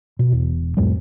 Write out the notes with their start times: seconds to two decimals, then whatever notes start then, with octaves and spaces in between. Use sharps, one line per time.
0.19 B2
0.32 E1
0.77 C2 F2 A2 G3